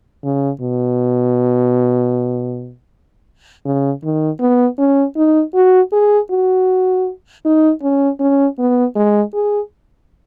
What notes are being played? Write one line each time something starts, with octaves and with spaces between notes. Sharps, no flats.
C#3
B2
C#3
D#3
B3
C#4
D#4
F#4
G#4
F#4
D#4
C#4
C#4
B3
G#3
G#4